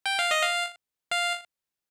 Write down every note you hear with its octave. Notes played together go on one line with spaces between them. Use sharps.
G5
F5
D#5
F5
F5